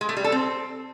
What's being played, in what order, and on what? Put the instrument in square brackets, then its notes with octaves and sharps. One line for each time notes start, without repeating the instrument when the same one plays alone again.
[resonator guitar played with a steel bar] G#3
A3
G3
A4
C4